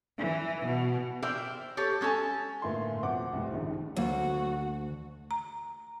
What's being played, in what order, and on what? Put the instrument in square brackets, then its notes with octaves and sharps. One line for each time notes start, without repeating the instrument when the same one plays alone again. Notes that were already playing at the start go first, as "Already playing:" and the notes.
[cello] E3
B2
[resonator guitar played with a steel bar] A#4 C5 D5 E5 G5
G4 A4 C#5
G#3 C#4 A4 A5
[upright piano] G1 A2 A#3 E4 B4 C6
F2 B2 C5 F#5 D6
C2 F2 A2
A#1 D#2 G#2 C#3
[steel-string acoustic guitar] D2 [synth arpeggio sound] F#3 A#3 [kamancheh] F#4
[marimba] A#5